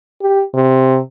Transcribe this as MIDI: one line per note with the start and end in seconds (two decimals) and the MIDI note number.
0.22 0.43 67
0.54 0.98 48